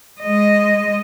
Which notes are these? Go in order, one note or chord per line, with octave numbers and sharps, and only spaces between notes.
G#3 D#5